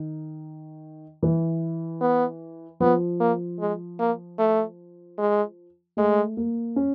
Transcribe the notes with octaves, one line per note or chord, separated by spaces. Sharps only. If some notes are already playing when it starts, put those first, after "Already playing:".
Already playing: D#3
E3
B3
F3 B3
A#3
G#3
A#3
A3
G#3
G#3 A3
A#3
C#4